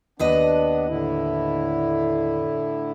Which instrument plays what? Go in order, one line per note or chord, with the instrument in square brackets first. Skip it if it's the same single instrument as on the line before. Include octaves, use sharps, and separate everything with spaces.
[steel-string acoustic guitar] D#2 B4 D#5 [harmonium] B3 D4
[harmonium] A2 D3 E4